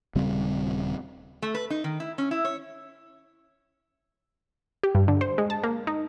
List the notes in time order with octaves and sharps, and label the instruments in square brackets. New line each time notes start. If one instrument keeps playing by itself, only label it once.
[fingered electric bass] D#1 C#3 G3 C4
[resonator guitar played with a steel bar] A3
B4
D#4
D#3
E4
C#4
E4
C#5
[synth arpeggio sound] G4
G2
D3
C5
G#3
A5
A#3
D#4